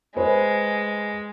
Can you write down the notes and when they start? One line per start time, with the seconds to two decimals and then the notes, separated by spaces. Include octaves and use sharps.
0.17 G#3 B4 C5